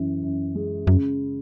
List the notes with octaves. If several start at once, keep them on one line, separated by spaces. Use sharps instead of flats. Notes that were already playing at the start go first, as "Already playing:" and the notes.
Already playing: F#2 E3
F#2
G#3
F#2 C#3